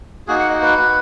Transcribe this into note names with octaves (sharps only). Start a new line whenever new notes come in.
A#3 D#4 F#4 G#4
F#5
D#5
B4